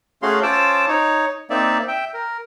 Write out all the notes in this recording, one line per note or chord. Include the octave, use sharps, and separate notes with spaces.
A3 C#4 F#4 G#4 F5 C6
C#4 F4 C5 A5 D6 E6
D#4 C#5
A#3 C4 D#4 D5 E5
E5 G5
A#4